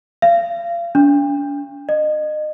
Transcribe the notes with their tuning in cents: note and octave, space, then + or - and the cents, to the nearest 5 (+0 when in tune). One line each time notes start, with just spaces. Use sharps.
F5 -35
D4 -40
D#5 -30